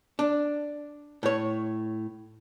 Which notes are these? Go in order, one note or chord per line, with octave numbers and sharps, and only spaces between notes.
D4
A2 C#5